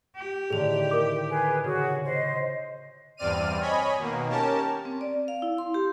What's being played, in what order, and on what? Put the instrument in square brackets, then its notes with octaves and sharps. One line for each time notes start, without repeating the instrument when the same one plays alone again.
[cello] G4
[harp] A2 D3 D#3 [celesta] G#4 F7
[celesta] A#4 D6
[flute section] G#4 B4
[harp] C#3 [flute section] F#4 G#4
[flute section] C5 D#5
[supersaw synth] E2 G2 C4 D5 F6 D#7
C#5 D#5 G#5 B5
B2 D#3 A#3
C#4 G4 A#4 A5
[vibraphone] C4
D5
F5
E4
C6
G4